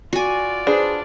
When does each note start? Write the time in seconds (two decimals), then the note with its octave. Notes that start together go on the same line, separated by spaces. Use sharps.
0.13 F4 F#4 D5 G#5
0.67 D4 G#4 B4 C5